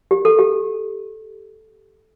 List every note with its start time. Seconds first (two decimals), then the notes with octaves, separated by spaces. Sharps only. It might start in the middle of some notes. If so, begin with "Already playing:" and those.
0.11 G4
0.25 A4
0.39 G4